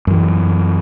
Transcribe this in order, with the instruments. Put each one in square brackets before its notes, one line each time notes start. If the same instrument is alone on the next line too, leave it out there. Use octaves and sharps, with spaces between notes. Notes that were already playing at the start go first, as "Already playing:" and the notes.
[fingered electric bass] F#2 E3